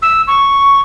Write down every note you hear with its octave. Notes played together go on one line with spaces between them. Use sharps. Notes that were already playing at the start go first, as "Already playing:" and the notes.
E6
C#6